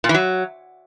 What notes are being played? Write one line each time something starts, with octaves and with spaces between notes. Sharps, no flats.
A#2
E3
F#3